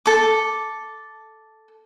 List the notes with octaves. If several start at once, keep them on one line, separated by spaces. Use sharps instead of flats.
A4 D6